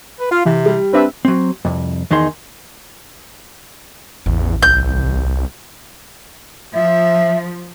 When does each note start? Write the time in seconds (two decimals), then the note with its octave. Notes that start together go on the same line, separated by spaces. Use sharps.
0.20 B4
0.31 F4 F5
0.46 C3 E3
0.66 G3
0.93 C4 D4 B4 E5
1.25 F#3 C4
1.65 C2 F2
2.11 E2 D#3 D#4 G#4 C6
4.26 A1 E2
4.62 C2 G6
6.74 F3 E5